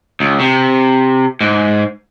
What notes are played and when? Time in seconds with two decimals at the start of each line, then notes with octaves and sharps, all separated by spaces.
0.20 C#2
0.40 C3
1.41 G#2